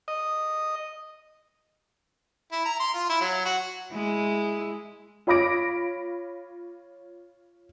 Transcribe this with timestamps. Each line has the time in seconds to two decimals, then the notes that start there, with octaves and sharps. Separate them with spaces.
0.08 D#5
2.52 E4
2.65 A#5
2.80 C6
2.94 F4
3.09 E4
3.21 F#3
3.45 F#4
3.92 G#3 E4
5.27 F4 C#5 B5 D6 A#6 D7